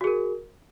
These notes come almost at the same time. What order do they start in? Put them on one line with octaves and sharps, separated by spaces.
F#4 G#4 A#4